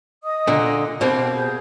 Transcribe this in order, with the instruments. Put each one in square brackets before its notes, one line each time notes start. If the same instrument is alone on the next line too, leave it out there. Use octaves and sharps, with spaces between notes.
[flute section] D#5 D#6
[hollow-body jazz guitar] A#2 D3
[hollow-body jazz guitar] B2 A#3 C4 [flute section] G4
[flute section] G#4 G6